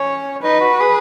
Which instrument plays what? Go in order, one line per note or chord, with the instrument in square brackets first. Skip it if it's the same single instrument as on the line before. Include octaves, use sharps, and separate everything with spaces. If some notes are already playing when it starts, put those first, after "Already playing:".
Already playing: [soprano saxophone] C#4 [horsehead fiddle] C#5
[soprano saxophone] D#4 [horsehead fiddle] B4
[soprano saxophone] F#4
G#4